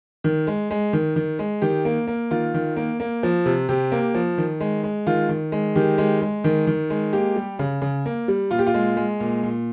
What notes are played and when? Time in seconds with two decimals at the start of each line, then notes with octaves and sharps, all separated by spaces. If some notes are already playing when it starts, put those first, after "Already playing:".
0.24 D#3
0.47 G#3
0.71 G#3
0.93 D#3
1.16 D#3
1.39 G#3
1.62 D#3 G4
1.85 A#3
2.07 A#3
2.31 D#3 F4
2.54 D#3
2.76 A#3
3.00 A#3
3.23 F3
3.46 C3
3.69 C3 G4
3.92 A#3
4.15 F3
4.38 D#3
4.61 G#3
4.84 G#3
5.07 D#3 F4
5.29 D#3
5.52 G#3
5.76 D#3 G4
5.98 G#3
6.22 G#3
6.44 D#3
6.67 D#3
6.90 G#3
7.13 A#3 G4
7.36 G3
7.59 C#3
7.82 C#3
8.06 A#3
8.28 G3
8.51 A#2 F4
8.59 G4
8.67 F4
8.74 G#3
8.97 G#3
9.20 A#2
9.43 A#2